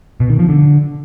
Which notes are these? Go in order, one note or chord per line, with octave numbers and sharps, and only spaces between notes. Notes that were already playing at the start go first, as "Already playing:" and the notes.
B2
D#3
F3
D3